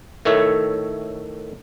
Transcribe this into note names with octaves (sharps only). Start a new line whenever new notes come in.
A2 D#3 A3 C#5 E5